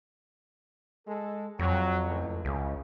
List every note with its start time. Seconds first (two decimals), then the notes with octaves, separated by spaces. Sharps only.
1.06 G#3 A4
1.59 F2 F#3
2.05 C#2 A2
2.45 C#2 C#3